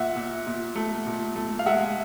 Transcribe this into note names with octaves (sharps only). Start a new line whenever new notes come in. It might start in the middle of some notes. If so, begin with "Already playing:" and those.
Already playing: A#2 E5 F#5
A#2
A#2
A3
A#2
A3
F5
G#3 E5 F#5